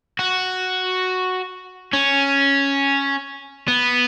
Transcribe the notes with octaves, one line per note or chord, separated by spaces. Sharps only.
F#4
C#4
B3